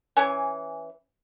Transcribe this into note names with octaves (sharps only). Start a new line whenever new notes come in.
E3 C#4 G#5